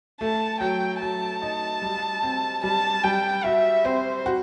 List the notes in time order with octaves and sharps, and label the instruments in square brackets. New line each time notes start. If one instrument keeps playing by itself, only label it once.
[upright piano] A3 [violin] A5
[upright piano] F#3 [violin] G5
[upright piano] F#3 [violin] A5
[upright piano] D#4
G3
C4
[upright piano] G3 [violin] A5
[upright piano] G3 [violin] G5
[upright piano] F#4 [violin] E5
[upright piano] C4 [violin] C5
[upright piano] F#4